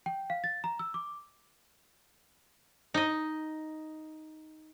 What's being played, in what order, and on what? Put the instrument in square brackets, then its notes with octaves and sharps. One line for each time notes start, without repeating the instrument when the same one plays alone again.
[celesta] G5
F5
A6
A#5
E6
D6
[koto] D#4 D#5